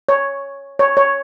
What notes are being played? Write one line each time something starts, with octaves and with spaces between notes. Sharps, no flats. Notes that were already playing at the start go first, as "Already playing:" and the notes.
C#5
C#5
C#5